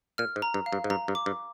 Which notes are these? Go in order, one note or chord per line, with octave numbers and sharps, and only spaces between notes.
A#2 F6
G#2
A#5
G2
F5
G2
G#2
G2 A#5
G2
D6
G2